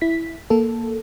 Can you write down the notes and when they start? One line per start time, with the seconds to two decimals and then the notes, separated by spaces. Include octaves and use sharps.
0.01 E4 B6
0.50 A#3 A4